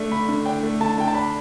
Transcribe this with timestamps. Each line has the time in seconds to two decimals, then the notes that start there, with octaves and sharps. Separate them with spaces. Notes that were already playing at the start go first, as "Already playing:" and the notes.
Already playing: A3 D4
0.11 D3 B5
0.29 D3
0.45 D4 G5
0.63 A3
0.81 D3 A5
0.98 D3 G5
1.08 A5
1.15 D4 B5